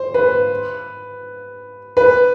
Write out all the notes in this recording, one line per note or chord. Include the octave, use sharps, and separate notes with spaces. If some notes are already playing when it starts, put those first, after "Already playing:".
Already playing: C5
B4
B4